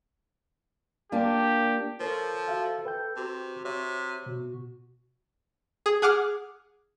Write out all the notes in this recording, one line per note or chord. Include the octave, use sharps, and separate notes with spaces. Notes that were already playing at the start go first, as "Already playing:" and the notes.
A#3 D4 F4 G4
F3 A4 A#4 C5 C#5
F#4 E5 F5
B4 G5 G6
C3 F#4
C3 C#5 E5
B2 F#4
G#4
G#4 F#5 D6 F6